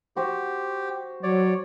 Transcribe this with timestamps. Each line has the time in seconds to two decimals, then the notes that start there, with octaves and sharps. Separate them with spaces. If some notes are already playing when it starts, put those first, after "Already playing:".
0.17 F#4 G4 C5
1.23 F#3 C#5 D5